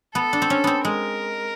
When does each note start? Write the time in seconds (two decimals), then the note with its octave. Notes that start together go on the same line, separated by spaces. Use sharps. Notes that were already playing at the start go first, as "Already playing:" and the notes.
0.15 B3 A4
0.33 D4
0.42 C4
0.50 C#4
0.64 B3 C4
0.85 G#3 A#4